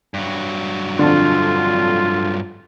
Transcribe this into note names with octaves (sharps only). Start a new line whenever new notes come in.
G2 F#3
F2 D3 F4